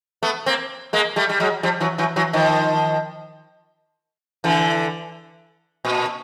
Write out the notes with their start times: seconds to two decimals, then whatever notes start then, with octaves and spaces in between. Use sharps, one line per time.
0.23 A3 B3
0.46 A#3 C4
0.93 G#3 A#3
1.16 G3 A3
1.29 G3
1.40 F#3 G#3
1.63 F3 G3
1.80 E3 F#3
1.98 E3 F#3
2.16 E3 F#3
2.33 D#3 F3
4.44 D3 E3
5.85 A#2